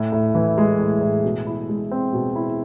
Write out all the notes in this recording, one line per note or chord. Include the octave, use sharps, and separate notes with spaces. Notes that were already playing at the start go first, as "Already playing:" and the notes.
Already playing: A2
A2
E3
G#3
A2
A2
B2
E4
G#3
C4
B2
E4